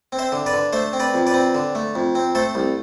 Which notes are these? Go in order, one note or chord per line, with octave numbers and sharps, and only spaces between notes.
C4
C5 E5
D3
B4 D5
D3
A3 C5 E5
C4
B4 D5
F2
B4 D5
C4
D3
A3
F2
C4
A3 A4 C5
C2